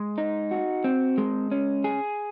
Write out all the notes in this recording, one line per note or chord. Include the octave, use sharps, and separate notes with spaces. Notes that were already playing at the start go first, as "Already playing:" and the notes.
Already playing: G#3
D#4
F#4
C4
G#3
C#4
G#4